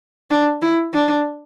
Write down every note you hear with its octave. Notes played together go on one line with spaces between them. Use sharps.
D4
E4
D4